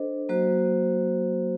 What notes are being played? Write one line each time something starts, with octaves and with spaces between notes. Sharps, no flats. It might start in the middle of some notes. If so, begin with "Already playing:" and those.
Already playing: D4 A4 C5 D#5
F#3 A#3 F#4 C5